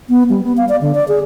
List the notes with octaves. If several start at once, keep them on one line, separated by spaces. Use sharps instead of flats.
B3
G3
B3
F5
D5
D3
D5
G#4